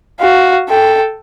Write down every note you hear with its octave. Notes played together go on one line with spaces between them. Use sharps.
F#4 F5
A4 G5